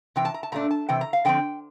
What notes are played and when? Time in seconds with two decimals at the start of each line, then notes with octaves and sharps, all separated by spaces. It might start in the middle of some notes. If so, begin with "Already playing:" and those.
0.16 C3 E3 G5
0.25 A5
0.34 A#5
0.43 A5
0.52 A#2 A3 D4 A#5
0.71 A5
0.89 C3 E3 G5
1.01 A#5
1.13 F5
1.25 D3 F3 C4 G5